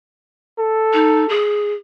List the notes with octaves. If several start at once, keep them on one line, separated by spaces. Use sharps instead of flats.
A4
D#4
G#4